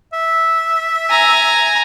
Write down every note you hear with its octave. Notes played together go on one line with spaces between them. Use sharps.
E5
G#5 A#5